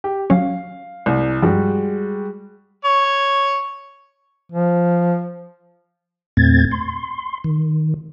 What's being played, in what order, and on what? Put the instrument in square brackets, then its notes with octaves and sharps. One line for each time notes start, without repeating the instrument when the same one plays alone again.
[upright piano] G4
[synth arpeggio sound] F#3 C#4 [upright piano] F5
[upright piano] C2
[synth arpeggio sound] G2 F3 [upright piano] G3 G#3 F#4
[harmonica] C#5
[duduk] F3
[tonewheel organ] E2 A#2 A3 C4 G#6 A6
C6
D#3